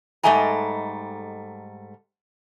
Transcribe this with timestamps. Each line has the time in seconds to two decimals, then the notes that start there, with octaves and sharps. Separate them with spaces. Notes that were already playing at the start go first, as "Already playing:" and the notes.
0.23 G#2 G3 A3 D#5 G#5 A#5